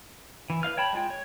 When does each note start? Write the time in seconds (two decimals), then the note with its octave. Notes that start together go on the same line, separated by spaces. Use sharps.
0.50 E3
0.63 B4 D#5 F5 F6
0.77 C#5 G5 A5 B5
0.93 G#3 F4 G5
1.10 C#5